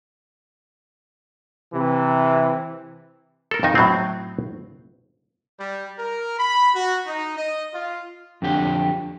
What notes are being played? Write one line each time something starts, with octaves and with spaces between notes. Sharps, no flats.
C3 E3
A4 A#4
F2 D#3 D#4 G#5
A2 F#3 B3 C4
G3
A#4
B5
F#4
D#4
D#5
F4
F2 D3 G4